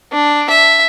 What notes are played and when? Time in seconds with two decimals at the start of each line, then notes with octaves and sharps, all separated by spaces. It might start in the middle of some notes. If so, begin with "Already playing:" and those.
0.13 D4
0.50 E5